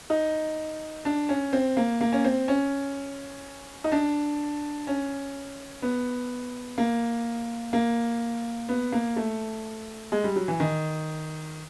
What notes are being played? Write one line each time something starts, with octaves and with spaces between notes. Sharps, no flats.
D#4
D4
C#4
C4
A#3
A#3
C#4
C4
C#4
D#4
D4
C#4
B3
A#3
A#3
B3
A#3
A3
G#3
G3
F#3
E3
D#3